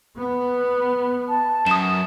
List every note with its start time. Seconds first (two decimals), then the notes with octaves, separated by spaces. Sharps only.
0.17 B3
1.29 A5
1.67 F#2 D#6 E7